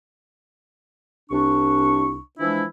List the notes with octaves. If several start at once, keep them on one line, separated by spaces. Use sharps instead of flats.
C2 D4 C#6
E3 F3 G#3 D4 E4